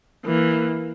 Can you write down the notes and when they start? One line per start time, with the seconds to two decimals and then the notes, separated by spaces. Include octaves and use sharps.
0.25 E3 A#3